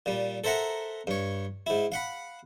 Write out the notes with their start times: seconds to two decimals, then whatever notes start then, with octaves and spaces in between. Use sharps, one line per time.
0.06 A#2 G3
0.44 A4 A#4 C5 E5 F#5 A#5
1.07 G2 C#5
1.67 G#2 E4
1.92 F5 F#5 B5